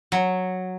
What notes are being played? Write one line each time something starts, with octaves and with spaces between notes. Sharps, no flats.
F#3